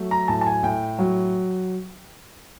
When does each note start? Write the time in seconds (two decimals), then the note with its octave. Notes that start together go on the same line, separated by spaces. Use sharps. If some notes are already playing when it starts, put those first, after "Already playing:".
Already playing: F#3 A3
0.11 A#5
0.28 A2 A5
0.41 A5
0.47 G#5
0.63 A2 G5
0.99 F#3